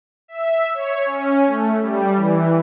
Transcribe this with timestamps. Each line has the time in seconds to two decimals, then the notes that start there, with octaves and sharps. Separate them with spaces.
0.28 E5
0.74 C#5
1.06 C#4
1.47 A3
1.82 G3
2.16 E3